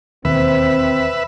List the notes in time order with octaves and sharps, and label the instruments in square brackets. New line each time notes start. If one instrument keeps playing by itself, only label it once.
[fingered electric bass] E1 D#2 [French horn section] C4 [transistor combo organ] B4 E5